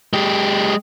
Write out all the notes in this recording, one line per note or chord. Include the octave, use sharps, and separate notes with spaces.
G#3 G4